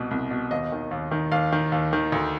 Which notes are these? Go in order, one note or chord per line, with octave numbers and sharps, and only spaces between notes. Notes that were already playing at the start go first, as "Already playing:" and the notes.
Already playing: C2 B2
C2
B2
D#2 D#5
D#3
D#2
D#3
D#2 F5
D#3
D#2
D#3
D2